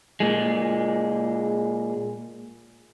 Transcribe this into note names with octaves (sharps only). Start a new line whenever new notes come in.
A#2 G#3